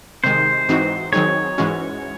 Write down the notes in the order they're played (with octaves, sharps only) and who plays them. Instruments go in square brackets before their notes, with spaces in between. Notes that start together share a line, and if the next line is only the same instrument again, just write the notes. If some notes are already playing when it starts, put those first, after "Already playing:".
[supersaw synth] C3 D#3 G#3 [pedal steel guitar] C5
[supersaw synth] G#2 E3 C4 D#4 F#4
[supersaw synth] D#3 F#3 C4 D#4 G#4 [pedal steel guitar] C#5
[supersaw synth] G#2 E3 G#3 C#4 F#4